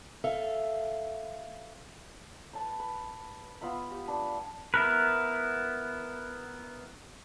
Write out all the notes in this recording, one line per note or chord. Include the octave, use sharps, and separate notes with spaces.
A4 E5 F5
B4 A5 B5
B4
B3 F4 E5 B5
G4
D4 B4
B3 E4 A#4 B4